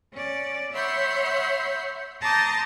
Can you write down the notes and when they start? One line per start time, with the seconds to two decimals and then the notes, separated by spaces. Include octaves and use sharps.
0.12 C#4 D5
0.72 C#5 E5 F#5 B5 C6 G6
2.21 A5 A#5 C6 D6 D#6 G6